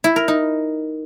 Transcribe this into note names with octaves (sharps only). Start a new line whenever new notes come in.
E4
A#4
D#4